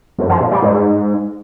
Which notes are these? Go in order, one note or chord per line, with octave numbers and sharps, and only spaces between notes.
F#2
F3
A#2
G3
G#2